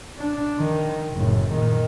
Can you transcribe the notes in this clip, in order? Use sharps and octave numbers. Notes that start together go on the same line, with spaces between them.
D4
D#3
F#1 A2
A#2 D#3